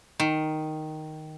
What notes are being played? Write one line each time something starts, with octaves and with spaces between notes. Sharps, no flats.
D#3